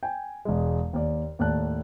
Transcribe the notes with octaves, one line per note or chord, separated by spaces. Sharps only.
G5 G#5
E1 G#3
D#2 D5
D#2 A2 D5 A5 F#6